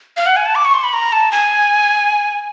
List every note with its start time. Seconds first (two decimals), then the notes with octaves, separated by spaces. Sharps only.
0.17 F5
0.26 F#5
0.36 G#5
0.46 A5
0.55 D6
0.65 C#6
0.74 C6
0.84 B5
0.93 A#5
1.12 A5
1.32 G#5